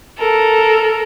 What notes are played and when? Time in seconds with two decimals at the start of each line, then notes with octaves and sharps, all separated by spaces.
0.19 A4 A#4